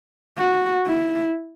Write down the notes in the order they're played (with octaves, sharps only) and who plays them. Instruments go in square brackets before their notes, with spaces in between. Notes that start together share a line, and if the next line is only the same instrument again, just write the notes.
[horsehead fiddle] F#4
E4